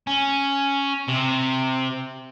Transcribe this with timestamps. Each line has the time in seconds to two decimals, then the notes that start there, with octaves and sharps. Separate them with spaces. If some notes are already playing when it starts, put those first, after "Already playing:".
0.07 C#4
1.08 C3